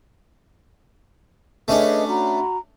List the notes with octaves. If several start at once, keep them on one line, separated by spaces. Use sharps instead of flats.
A3 C#4 D4 G#4 B4 D#5
F#4 A#5 B5